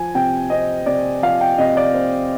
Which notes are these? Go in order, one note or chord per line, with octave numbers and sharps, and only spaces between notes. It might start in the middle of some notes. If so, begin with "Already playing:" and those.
Already playing: F3 G#5
C3 G5
C4 D#5
C3 D5
F3 F5
G5
C3 D#5
D5
C4